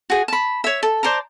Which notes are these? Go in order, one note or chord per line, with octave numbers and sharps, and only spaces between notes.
F#4 G#4
A5 B5
C#5 E5
A4
C5 D5 A5 A#5